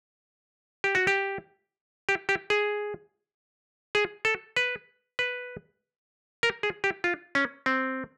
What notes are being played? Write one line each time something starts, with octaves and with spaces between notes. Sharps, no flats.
G4
F#4
G4
G4
G4
G#4
G#4
A4
B4
B4
A#4
G#4
G4
F4
C#4
C4